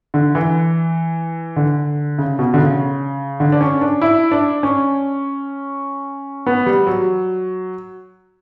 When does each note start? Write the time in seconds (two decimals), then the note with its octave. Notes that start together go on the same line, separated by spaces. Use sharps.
0.14 D3
0.35 E3
1.56 D3
2.18 C#3
2.39 B2
2.54 D3
2.58 C#3
3.40 D3
3.52 D4
3.61 C#4
3.81 D4
4.01 E4
4.31 D4
4.63 C#4
6.47 B3
6.66 G3
6.87 F#3